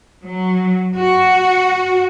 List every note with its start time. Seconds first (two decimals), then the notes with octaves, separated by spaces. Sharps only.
0.23 F#3
0.96 F#4